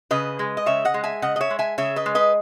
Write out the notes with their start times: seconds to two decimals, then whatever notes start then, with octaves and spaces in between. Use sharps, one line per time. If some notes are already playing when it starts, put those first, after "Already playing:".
0.11 C#3 B4 D#5
0.39 G#3
0.57 D#5
0.66 C#3 C#5 E5
0.85 D#5 F#5
0.94 G#3
1.04 E5 G#5
1.22 C#3 D#5 F#5
1.36 D#5
1.41 C#5 E5
1.50 G#3
1.59 E5 G#5
1.78 C#3 C#5 E5
1.96 B4 D#5
2.06 G#3
2.15 B4 D#5